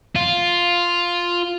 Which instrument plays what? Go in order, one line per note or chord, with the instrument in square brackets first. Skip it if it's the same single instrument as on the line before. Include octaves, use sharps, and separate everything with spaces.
[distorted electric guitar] F4